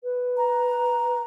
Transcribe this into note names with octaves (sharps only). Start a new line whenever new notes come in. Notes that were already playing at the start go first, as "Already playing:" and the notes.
B4
A#5